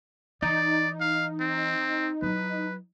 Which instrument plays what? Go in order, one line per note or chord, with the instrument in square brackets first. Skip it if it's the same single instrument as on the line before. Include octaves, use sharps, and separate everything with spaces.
[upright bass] E3 [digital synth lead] D#4 [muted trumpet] D5
[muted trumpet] F5
C4
[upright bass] F#3 E4 [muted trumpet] B4